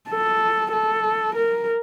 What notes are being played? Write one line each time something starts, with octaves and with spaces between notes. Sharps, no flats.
A4
A4
A#4